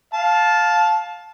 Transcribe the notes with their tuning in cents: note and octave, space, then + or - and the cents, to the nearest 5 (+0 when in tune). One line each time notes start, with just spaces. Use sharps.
F5 +15 A5 -10